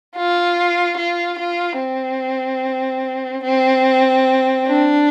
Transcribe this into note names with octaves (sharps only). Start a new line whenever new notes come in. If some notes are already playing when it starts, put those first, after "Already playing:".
F4
F4
F4
C4
C4
D4